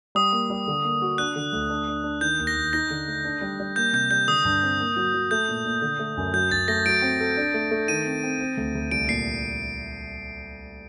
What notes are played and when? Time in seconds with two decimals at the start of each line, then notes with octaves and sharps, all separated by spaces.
0.15 G3 D#6
0.32 A#3
0.50 G3
0.68 D3
0.84 A#3
1.02 F#4
1.18 D4 F#6
1.36 D3
1.53 D2
1.70 D4
1.88 D4
2.04 D4
2.21 D#3 G6
2.39 D#2
2.47 A#6
2.56 D#2
2.73 D#4 A#6
2.90 D3
3.07 A3
3.25 D4
3.41 G3
3.60 G3
3.76 A#3 G6
3.93 C3 G6
4.10 G3 G6
4.28 D3 D#6
4.45 G2
4.63 C4
4.80 A#3
4.96 F#3
5.14 F#3
5.31 A3 G6
5.49 A#2
5.65 A#2
5.82 D3
5.99 A3
6.17 F#2
6.33 F#3 G6
6.51 F#2 A6
6.68 A3 A#6
6.86 F#3 D7
7.02 C4
7.20 A4
7.37 D4
7.54 A3
7.71 A3
7.88 D#3 D#7
8.06 C4
8.23 C4
8.41 C4
8.57 D2
8.75 D2
8.91 C2 D7
9.08 A#2 C7